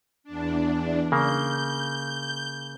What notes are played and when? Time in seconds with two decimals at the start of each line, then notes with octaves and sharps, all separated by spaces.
0.24 E2 D4
1.12 C#3 A#3 G6